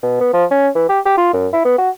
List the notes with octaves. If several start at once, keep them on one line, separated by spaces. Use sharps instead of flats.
B2
B3
F3
C#4
E3
G4
G4
F4
F#2
E4
B3
F#4